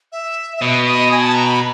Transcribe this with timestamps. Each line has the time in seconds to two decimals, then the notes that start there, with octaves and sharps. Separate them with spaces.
0.12 E5
0.57 E5
0.61 B2 D#5
0.86 D#5
1.11 G#5
1.22 A5
1.35 A#5
1.47 B5